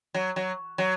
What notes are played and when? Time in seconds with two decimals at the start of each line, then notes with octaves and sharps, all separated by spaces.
0.14 F#3
0.36 F#3
0.78 F#3